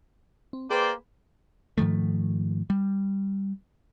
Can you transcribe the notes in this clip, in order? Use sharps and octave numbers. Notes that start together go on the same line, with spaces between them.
C4
A#3 G#4 B4 C5 D5 G5
G#2 D#3 F3 A3
G3